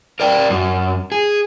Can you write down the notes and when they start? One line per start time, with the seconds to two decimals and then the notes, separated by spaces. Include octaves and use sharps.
0.20 A#4 D5 G5
0.50 F#2
1.12 G#4